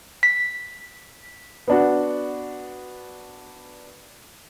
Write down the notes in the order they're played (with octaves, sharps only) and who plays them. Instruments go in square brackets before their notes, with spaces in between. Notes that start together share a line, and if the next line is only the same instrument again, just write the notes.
[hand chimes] B6
[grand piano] B3 D4 F#4